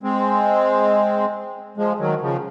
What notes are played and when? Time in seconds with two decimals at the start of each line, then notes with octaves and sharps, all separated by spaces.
0.03 G#3 C4
1.77 F3 G#3
1.99 D#3 F#3
2.22 C#3 F3